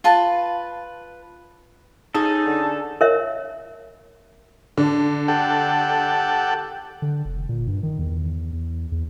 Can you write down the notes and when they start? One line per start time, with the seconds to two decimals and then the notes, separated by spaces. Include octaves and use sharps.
0.04 F4 B4 A5
2.14 C#4 D#4 G#4 A4
2.46 D3
3.01 A#4 C#5 E5
4.77 D3
5.28 G4 A4 F#5
7.02 D3
7.25 F1
7.49 A#2
7.67 G2
7.83 D#3
7.99 E2
8.53 E2
8.92 E2